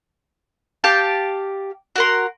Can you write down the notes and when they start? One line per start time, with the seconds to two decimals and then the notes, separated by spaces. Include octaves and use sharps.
0.84 G4 F5 G5 A5
1.96 F#4 A#4 C6